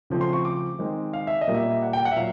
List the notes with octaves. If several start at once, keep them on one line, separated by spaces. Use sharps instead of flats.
C#3 F3 A3 C4
C6
C#6
D6
D#3 G#3 C4
F5
E5
D#5
A#2 G3 A#3
E5
F#5
G5
F#5
E5
A#2 F#3 F5